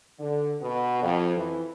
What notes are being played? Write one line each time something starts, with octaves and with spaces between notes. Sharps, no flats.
D3
B2
F2
E3